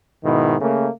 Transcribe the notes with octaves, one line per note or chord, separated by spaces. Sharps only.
G#2 B2 D#3 E4
C#3 A3 A#3